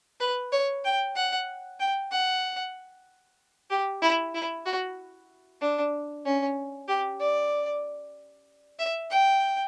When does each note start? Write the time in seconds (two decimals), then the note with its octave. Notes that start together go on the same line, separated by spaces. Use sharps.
0.20 B4
0.52 C#5
0.84 G5
1.15 F#5
1.79 G5
2.11 F#5
3.70 G4
4.02 E4
4.34 E4
4.65 F#4
5.61 D4
6.25 C#4
6.88 G4
7.20 D5
8.79 E5
9.11 G5